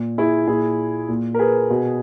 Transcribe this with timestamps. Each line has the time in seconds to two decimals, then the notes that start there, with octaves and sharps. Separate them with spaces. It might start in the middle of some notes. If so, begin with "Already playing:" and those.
Already playing: A#2
0.18 E4 G#4
0.47 A#2 E4 G#4
1.09 A#2
1.34 A#4
1.39 G#4 B4
1.70 B2